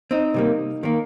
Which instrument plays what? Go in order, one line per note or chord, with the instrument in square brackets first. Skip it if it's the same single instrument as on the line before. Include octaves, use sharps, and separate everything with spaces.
[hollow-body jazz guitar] C4 D#4
C3 G3 A#3
D#3 A#3